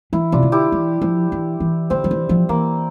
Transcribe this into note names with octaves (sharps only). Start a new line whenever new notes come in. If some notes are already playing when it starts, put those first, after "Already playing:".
E3 E4
C3 D4 F4
D3
E4 G4
E3
F3
E3
E3
D3 C4
F3
E3
F3
E3 A#3